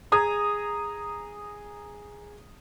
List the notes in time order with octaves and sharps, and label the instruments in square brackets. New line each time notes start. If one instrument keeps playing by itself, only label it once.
[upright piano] G#4 A#5 D#6 G#6